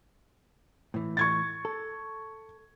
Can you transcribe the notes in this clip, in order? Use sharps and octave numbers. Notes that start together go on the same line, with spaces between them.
A2 E3
C#6 G#6 A6
A4